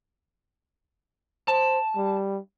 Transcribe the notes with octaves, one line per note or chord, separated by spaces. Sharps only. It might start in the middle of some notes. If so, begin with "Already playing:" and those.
C5 A5
G3